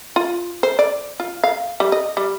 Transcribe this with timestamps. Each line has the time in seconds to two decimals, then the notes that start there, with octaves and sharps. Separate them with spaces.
0.16 F4
0.63 C5
0.79 D5
1.20 F4
1.44 F5
1.80 G3
1.92 D#5
2.17 G3